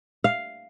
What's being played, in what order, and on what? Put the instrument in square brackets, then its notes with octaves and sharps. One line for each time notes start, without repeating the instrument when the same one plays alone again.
[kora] F5